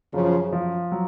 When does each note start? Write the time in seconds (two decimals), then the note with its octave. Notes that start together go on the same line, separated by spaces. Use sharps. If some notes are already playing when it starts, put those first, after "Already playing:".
0.13 F#2 C#3 F3
0.53 F3
0.92 F#3